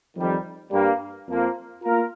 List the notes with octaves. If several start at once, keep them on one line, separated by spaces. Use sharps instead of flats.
F2 D#3 G3
G2 G3 A#3
F2 F3 A#3
A#3 F4 A#4